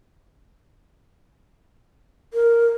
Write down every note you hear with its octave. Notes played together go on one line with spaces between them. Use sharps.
A#4